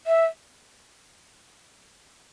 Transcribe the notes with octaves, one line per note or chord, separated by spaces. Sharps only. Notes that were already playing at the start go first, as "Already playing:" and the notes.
E5